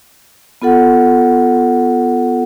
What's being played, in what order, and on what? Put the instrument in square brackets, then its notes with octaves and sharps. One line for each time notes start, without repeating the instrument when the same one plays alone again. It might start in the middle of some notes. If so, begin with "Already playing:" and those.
[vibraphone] B3 F4 A4 F#5